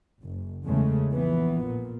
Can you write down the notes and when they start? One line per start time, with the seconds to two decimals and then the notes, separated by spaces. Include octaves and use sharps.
0.23 F#1
0.66 E2 C#3 G#3 A3
1.13 A#1 E3 B3
1.64 A#2